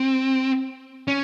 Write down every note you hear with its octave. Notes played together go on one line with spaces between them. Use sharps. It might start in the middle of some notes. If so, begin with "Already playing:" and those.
Already playing: C4
C#4